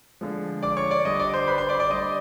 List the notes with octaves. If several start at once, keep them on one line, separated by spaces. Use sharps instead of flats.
D3 F3 G#3
D5 D6
C#5 C#6
D5 D6
D3 G3 D#5 D#6
D5 D6
C5 C6
B4 B5
C5 C6
D5 D6
D5 D6
D3 G3 D#5 D#6